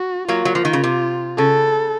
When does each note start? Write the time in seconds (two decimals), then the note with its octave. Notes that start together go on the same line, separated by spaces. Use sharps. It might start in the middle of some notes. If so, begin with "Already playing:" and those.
Already playing: F#4
0.28 F#3 A#3 F4
0.45 F#3
0.55 F3
0.65 D#3
0.73 C#3
0.84 C3
1.38 C#3 A4